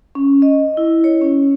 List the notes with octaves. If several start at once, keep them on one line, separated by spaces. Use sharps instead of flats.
C#4
D#5
E4
C#5
C#4